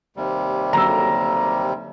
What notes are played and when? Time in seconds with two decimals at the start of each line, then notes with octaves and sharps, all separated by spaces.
0.17 D#2 C3 G3
0.73 D3 F#3 A#3 A#5 E6